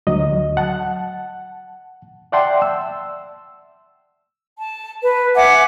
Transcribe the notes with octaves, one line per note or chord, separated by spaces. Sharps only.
D2 F#3 D#5
F#5 A5
D5 E5 F#5 G5 A5 C6
E6
A5
B4
E5 F#5 G#5 D6